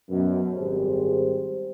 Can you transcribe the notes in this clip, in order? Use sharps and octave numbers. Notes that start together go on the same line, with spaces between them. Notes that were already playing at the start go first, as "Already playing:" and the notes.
F#2 B2
G#1 G3 G4 G#4 C5